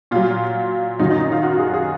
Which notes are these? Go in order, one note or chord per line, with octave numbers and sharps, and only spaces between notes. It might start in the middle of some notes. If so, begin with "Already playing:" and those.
A#2 F#3 F4
F#2 D#3 F#3 D#4
D#4
D#4
F4
F#4
G#4
G#4